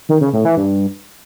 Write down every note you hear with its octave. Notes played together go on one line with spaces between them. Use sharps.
D#3
C#3
A2
E3
G2